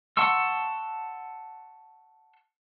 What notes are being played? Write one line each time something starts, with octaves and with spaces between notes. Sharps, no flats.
F#5 A5 C6 C#6 E6